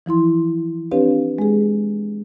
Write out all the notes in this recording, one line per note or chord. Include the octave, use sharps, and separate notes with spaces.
E3 F3 E4 C6
C4 D4 G4 B4 C#5 F5
G#3 G#4